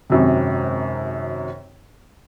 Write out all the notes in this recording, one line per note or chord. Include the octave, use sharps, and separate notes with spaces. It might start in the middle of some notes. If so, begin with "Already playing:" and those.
G#1 F#2 C3